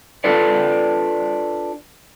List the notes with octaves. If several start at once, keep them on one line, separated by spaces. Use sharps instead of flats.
D4 F4 A4 B4 D5